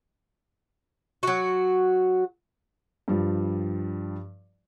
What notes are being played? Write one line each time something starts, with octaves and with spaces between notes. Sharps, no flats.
F#3 F#4
G2 F3 G3